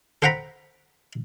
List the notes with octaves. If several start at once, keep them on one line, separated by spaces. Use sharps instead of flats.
A4 C5 F#5 G5 A#5 B5